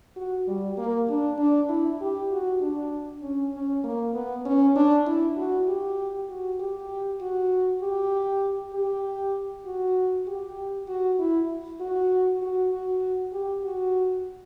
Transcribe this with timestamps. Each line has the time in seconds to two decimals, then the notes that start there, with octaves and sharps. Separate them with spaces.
0.16 F#4
0.48 G3
0.78 A#3
1.09 D4
1.39 D4
1.69 E4
2.01 G4
2.32 F#4
2.61 D4
3.22 C#4
3.54 C#4
3.84 A#3
4.14 B3
4.45 C#4
4.76 D4
5.07 E4
5.37 F#4
5.68 G4
6.29 F#4
6.60 G4
7.21 F#4
7.82 G4
8.74 G4
9.66 F#4
10.27 G4
10.88 F#4
11.19 E4
11.80 F#4
12.42 F#4
12.72 F#4
13.33 G4
13.64 F#4